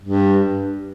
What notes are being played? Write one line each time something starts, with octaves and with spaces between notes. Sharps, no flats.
G2